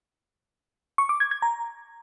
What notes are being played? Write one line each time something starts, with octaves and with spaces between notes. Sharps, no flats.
C#6
D6
G#6
G#6
A#5